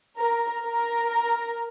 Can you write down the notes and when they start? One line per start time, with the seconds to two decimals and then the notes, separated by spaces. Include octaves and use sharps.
0.18 A#4
0.62 A#4